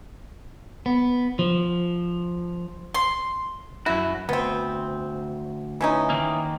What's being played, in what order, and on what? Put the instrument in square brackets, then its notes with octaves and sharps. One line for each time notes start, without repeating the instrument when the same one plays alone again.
[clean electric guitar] B3
F3
[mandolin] C6
[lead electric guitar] F#2 F#4 [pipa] E4
[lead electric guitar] D2 [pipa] B3 C4
[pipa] E3 C#4 D#4
[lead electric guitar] D#3 A#3